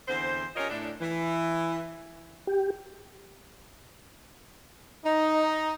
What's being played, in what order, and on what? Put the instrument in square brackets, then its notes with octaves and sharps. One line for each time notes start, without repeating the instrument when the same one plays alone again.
[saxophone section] E2 D3 C4 C5
C#4 F4 G4 A#4 C#5 D#5
A2 D4 A4
E3
[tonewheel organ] G4
[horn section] D#4